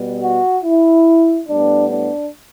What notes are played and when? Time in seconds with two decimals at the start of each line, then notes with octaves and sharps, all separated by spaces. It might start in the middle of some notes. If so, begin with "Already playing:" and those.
Already playing: B2 G3 B3
0.22 F#4
0.64 E4
1.49 A2 G3 B3 D4
1.91 D4